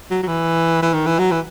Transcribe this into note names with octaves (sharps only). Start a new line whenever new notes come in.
F#3
F#3
E3
E3
D#3
E3
F#3
E3